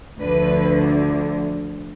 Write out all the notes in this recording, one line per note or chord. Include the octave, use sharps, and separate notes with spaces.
D2 D3 F3 B4